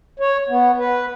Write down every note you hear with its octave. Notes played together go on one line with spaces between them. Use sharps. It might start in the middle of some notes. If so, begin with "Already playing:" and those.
C#5
B3
B4